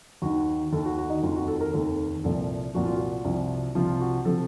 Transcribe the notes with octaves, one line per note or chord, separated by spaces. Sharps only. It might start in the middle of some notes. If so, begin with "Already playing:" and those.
D#2 D#3 F#4
D#2 D#3 A4
F#4
F#4
D#4
F1 D#2 D#3 F4
F#4
A4
A#4
F1 D#2 D#3 A4
C2 A#2 F3 A4
C2 A#2 F3 F#4
F4
F#4
C2 C3 F3
C2 C3 F3 F4
F#4
C3 F3 A4